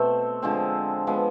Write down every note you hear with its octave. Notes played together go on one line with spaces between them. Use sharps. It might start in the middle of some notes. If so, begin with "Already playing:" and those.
Already playing: B2 A3 C4
D3 F3 G#3 C4
F3 G#3 B3